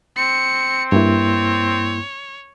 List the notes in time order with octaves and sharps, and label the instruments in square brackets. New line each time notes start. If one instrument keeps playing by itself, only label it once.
[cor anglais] C4 [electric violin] C#7
[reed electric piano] G2 A#3 E4 [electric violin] C#5